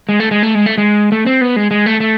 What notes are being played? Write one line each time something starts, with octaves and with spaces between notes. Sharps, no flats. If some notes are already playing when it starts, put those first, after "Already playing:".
G#3
A3
G#3
A3
G#3
A3
G#3
A3
C4
B3
G#3
G#3
A3
A3